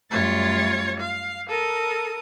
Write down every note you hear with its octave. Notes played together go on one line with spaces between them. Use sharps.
F#2 G3 A3 F4 C#5 A6
F5
A4 A#4 D#6